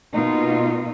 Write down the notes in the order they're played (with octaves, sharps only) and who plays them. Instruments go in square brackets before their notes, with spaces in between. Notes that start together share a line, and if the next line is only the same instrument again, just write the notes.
[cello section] B2 A#3 D#4 F4